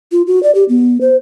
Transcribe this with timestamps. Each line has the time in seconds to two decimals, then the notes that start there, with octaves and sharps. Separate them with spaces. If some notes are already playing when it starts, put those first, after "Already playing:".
0.12 F4
0.27 F#4
0.43 D5
0.55 G4
0.69 B3
1.01 C5